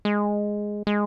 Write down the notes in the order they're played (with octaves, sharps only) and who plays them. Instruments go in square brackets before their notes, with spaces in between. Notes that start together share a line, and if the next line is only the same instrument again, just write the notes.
[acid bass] G#3
G#3